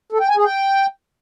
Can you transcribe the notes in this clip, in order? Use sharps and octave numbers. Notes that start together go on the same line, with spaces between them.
A4
G5
G#5
G#4
G5